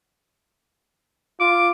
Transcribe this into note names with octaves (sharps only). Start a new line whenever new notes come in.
F4 D6